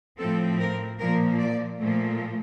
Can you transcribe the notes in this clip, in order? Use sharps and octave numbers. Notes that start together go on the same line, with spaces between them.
A2 F3 C4 A4
A#4
A#2 F3 A#3 A#4
D5
A#2 F3 A3